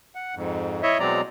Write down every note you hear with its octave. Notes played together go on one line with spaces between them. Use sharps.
F#5
F2 G#2
E4 C#5 D#5 E5
B2 F#3 G#3 C4 D5 A#5